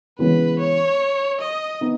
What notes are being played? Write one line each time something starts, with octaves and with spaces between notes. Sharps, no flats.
C#3 E3 G#3 B3 B4
C#5
D#5
B3 D#4